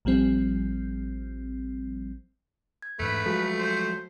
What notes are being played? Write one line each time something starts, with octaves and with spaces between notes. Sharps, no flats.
A1 F3 G3 C4
G#6
E2 G#2 A3 B4
F3 F#3 G#3 F#4 A4
C5